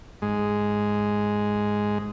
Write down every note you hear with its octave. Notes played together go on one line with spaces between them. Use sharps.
G#2 G#3